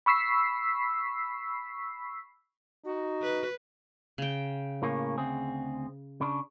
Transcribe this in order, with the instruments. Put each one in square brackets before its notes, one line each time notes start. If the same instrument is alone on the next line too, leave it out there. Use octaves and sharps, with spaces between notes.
[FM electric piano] B5 C#6 E6 B6 C7
[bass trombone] D#4 [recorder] F#4
[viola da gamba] B4
[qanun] C#3 G5
[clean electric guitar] A2 A#3 C#4
D2 C4 G#4
C#3 D4